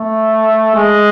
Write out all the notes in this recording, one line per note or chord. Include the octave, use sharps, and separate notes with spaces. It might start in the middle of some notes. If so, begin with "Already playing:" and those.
Already playing: A3
G#3